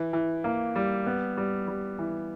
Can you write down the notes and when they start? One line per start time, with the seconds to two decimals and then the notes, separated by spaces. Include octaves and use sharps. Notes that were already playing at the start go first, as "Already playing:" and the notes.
Already playing: E3
0.13 E3
0.44 A#3
0.76 G3
1.06 B3
1.37 G3
1.68 G3
1.99 E3